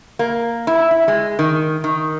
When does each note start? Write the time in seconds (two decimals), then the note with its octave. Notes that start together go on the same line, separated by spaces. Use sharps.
0.19 A#3
0.67 E4
0.91 E4
1.08 G#3
1.39 D#3
1.84 D#3